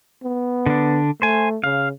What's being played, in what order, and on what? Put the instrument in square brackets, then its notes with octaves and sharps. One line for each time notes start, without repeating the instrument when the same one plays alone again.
[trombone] B3
[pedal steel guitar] D3 D4
[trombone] A3 [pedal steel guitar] C5 G#5
[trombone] C#3 [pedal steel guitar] F5